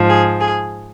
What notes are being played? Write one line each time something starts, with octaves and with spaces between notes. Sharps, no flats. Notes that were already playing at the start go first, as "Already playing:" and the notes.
Already playing: G#2 F3
G#4
G#4